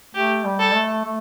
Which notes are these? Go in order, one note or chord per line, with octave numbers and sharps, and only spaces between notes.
A3 G4
G3
A4
A3
A3